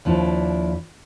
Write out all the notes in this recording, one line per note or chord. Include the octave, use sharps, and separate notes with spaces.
D#2 F3 D4 E4